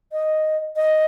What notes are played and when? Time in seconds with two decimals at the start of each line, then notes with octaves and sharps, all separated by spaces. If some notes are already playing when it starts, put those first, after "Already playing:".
0.12 D#5
0.76 D#5